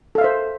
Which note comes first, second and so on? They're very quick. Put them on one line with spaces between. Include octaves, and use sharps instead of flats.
A4 F5 E5 C5